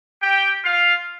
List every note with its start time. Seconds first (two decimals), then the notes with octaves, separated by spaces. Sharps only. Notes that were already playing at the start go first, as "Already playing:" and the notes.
0.22 G4 G5
0.64 F4 F5